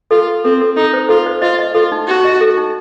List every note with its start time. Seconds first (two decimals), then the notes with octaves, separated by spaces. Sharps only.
0.11 F4 A4
0.28 A4
0.45 C4 A4
0.61 A4
0.76 D#4 A4
0.93 C5
1.09 F4 A4
1.26 C5
1.42 F4 D#5
1.59 D#5
1.74 F4 A4
1.92 D#4
2.07 D#4 F#4
2.25 D#5
2.41 A4
2.57 D#4